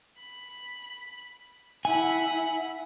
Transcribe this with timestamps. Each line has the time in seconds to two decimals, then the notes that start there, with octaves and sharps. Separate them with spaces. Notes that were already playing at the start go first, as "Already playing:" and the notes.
0.19 B5
1.85 E4 E5 F#5 G#5 B5